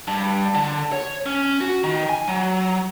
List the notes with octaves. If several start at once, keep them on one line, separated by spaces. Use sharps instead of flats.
G2
D3
C#5
C#4
F#4
D#3
G#5
F#3